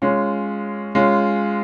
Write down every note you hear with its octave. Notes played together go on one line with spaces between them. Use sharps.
G#3 C#4 F4
G#3 C#4 F4